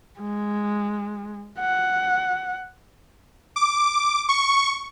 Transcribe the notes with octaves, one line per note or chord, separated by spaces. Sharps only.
G#3
F#5
D6
C#6